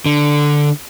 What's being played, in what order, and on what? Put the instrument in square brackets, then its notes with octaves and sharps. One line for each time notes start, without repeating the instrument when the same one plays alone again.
[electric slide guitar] D3